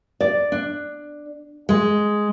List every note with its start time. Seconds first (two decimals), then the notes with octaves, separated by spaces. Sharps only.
0.21 D5
0.52 D4
1.69 G#3